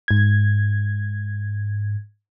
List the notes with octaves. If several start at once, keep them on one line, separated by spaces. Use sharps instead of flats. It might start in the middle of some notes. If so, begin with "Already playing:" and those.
G#2 G#6